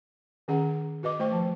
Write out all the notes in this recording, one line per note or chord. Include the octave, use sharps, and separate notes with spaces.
D#3 C#4 G#4 F#5 A#5
F#4 B4 D#5 D6
A3 C5 G5 C#6
F3 A5